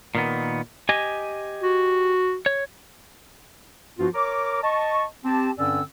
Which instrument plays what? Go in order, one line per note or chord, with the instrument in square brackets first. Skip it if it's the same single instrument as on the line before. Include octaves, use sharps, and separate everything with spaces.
[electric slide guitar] A#2 D#3 B3
G4 D#5 G#5
[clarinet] F#4
[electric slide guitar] C#5
[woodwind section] G2 F3 B3 F4 F#4
A#4 C#5 A#5 D6
D#5 A5 C#6
C4 G4 A5
G2 D3 C4 C#4 D5 E6